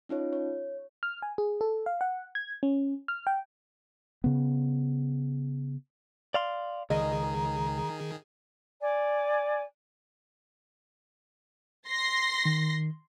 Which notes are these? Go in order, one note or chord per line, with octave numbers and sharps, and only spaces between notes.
C#4 D#4 F4 C#5
C#5
F6
G#5
G#4
A4
F5
F#5
G#6
C#4
F6
G5
C#3 B3
D5 F5 C6
C#2 D#3 G#4 D#5 A#5
D5 G#5
C6 A#6 C7
D#3